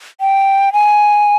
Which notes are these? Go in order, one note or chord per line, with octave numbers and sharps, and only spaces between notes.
G5
G#5